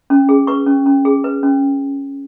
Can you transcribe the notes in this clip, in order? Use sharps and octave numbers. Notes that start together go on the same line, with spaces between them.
C#4
G#4
B4 C#6
C#4
C#4
G#4
B4
C#4